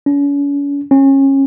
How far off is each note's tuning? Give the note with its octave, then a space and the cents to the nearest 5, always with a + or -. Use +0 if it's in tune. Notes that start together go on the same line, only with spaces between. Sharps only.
C#4 +40
C#4 -25